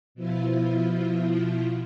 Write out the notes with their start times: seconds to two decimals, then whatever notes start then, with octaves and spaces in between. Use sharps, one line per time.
0.15 B2 F3 E4 F4